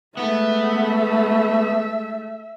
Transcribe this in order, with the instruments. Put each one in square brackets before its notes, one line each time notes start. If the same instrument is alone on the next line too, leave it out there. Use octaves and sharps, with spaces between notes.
[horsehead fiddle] G#3 A3 [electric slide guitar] B3 B4 [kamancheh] E5